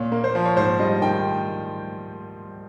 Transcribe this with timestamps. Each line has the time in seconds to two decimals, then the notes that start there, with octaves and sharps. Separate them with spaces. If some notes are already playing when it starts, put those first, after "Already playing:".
Already playing: A#2 C#5
0.12 A#3
0.24 C5
0.35 F3
0.45 C#5
0.57 G#2 C5
0.79 G3 D#5
1.02 D#3 G5